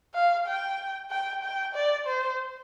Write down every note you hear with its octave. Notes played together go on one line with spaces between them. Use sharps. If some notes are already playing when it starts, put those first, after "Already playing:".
F5
G5
G5
G5
D5
C5